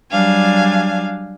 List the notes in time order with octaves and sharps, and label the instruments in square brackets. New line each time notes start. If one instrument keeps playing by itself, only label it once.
[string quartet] F#3 G3 D4 F5 G#5